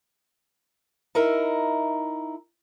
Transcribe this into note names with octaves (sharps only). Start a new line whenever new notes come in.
D#4 E4 A#4